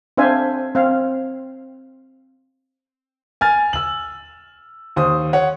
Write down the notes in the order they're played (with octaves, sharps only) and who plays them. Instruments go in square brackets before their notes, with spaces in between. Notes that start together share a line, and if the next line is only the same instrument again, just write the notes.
[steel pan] C4 D4 C5 E5 F5 G#5
C4 F5
[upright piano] G#5 F6 A6
E6 F#7
D#2 C5 D#6
C#5 F#5